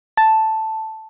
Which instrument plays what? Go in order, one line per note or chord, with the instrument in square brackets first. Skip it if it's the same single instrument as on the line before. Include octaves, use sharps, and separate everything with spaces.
[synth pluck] A5